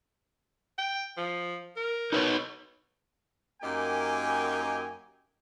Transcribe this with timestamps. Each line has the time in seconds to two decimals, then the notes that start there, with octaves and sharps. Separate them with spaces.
0.78 G5
1.17 F3
1.76 A#4
2.12 D#4 B4 C#5
3.62 F#2 A#3 D#4 G4 G5 G#5